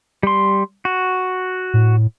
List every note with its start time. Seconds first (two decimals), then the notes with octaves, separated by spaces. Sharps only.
0.23 G3 C6
0.85 F#4
1.74 A2